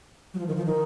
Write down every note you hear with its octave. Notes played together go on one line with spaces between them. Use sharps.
F#3
F3
D#3
F3
D#3